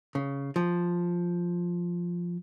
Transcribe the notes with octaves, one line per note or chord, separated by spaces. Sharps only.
C#3
F3